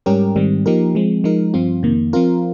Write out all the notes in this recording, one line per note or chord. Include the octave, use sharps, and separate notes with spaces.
G#2 G3 C#4 G4 A#4
G#2 D#3 G3 C4
F3 A#3 D#4 G4 A#4
F3 G#3 C4
F3 G#3 D#4 A#4
G2 F3 C4 F4
F2 C3 D#3 A#3
F3 C4 F4 A#4